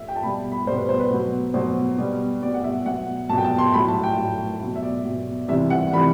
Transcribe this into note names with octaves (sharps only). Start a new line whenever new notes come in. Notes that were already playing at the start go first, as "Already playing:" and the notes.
Already playing: E5
G5
A5
B2 G3 B5
B5
B2 G3 C5
B4
C5
B4
B2 F#3
B2 F#3 C5
B2 G3
B2 G3 D5
F#5
E5
B2 F#3 F#5
B2 F#3 G5 A5
A5
C6
A2 F#3 B5
A5
G5
A2 F#3
B2 F#3
E5
D5
B2 F#3
C3 E3 G3 E5
F#5
C3 E3 G3 B5